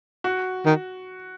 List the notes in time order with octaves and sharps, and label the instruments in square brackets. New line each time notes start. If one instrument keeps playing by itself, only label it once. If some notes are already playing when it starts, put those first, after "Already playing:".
[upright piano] F#4
[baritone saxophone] D#3